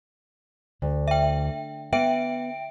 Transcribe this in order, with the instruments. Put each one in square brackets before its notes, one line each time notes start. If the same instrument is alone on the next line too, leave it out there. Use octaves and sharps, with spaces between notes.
[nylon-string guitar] D2
[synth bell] E5 G5
[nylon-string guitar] B3 [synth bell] E5 G5 D7